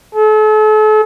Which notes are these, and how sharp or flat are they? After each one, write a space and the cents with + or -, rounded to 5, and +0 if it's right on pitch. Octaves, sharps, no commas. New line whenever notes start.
A4 -40